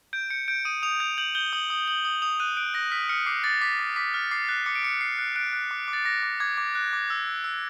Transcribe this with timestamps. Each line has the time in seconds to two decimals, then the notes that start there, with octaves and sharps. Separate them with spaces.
0.13 G6 D7
0.30 G6 C#7
0.48 G6 D7
0.65 D#6 D#7
0.83 D#6 F7
1.00 G6 F7
1.18 G6 F#7
1.35 G6 G7
1.53 D#6 F#7
1.70 D#6
1.88 D#6 F#7
2.05 D#6
2.22 D#6 F7
2.40 F#6 D#7
2.57 F#6 D7
2.74 F#6 A#6
2.91 F6 B6
3.09 F6 C#7
3.26 D6 C7
3.44 D6 A6
3.61 D6 B6
3.79 D6
3.96 D6 B6
4.14 F6
4.31 D6 C7
4.49 F#6
4.66 D6 C#7
4.75 D7
4.83 D6 C#7
5.01 F#6 C7
5.18 F#6
5.36 F#6 D7
5.53 F#6
5.71 D6
5.88 D6
5.93 A6
6.05 D6 A#6
6.23 D6
6.40 D6 G#6
6.58 D6
6.75 F#6
6.93 D6
7.10 E6
7.27 E6
7.44 E6